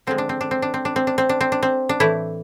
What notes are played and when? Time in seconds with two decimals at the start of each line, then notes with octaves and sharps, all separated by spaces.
0.07 D3 F3 G#3 C4
0.18 D4
0.29 C4
0.41 D4
0.51 C4
0.62 D4
0.74 C4
0.85 D4
0.96 C4
1.07 D4
1.18 C4
1.29 D4
1.41 C4
1.52 D4
1.63 C4
1.89 D4
2.00 A2 E3 A3 E4